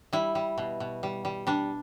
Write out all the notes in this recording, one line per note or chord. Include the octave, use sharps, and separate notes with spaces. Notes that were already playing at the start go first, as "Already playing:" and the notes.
G3 E4
G3
B2
B2
G3
G3
G3 D4